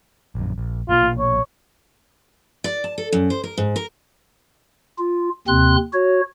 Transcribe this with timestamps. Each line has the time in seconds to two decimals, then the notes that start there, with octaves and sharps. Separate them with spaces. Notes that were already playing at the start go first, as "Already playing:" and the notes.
0.35 A#1 F#2
0.58 A#1
0.89 A#1 B2 A#3 F4
1.19 C#5
2.64 D5
2.84 A5
2.98 A4
3.13 F#2
3.30 C5
3.44 A#4
3.58 G#2
3.76 A#4
4.98 F4
5.48 D#2 C3 C4 C6 F#6
5.93 F#4 C#5